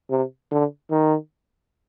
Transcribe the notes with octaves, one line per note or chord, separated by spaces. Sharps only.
C3
D3
D#3